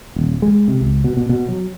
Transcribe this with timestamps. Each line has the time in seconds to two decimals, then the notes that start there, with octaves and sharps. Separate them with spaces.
0.16 D#1
0.42 G#3
0.68 C3
0.81 C#2
1.04 B2
1.17 B2
1.29 B2
1.48 F#3